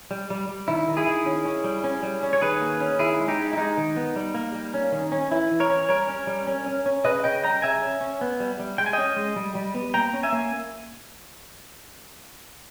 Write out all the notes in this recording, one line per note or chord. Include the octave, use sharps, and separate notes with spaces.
G3
G3
G3
D#3 E4
D#3
E4 G#4
D#3
C#4
C#4
G3
C#4
G3
C#4
C#5
D#3 G#4 B4
A#3
C#4
D#3 E4 G#4
G#3
D#4 G4
G#3
E4
G#3 D#4
D#3
B3
G3
A#3
G3
C#4
D#3
C#4
E3 E4
E3
A#4 C#5
C#4
G3 A#4 C#5
C#4
G3
C#4
C#4
C#4
C#3 B4 D#5
C#3 D#5 G5
G3 G5 A#5
C#3 E5 G#5
C#4
C#4
B3
G3
G3
G#3 G5
G#5
C#4 D#5 G5
G#3
G3
G3
B3
A#3 G5 A#5
C#4
E5 G#5
A#3